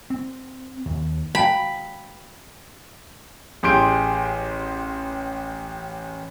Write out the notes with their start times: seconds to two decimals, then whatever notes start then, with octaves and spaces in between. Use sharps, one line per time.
0.10 C4
0.86 D#2
1.35 F5 G5 A5 B5
3.63 A1 G4 G#4 C6 G6 D7